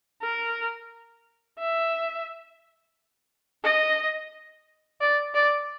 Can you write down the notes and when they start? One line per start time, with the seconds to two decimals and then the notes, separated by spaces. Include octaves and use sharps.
0.23 A#4
1.60 E5
3.64 D#5
5.00 D5
5.35 D5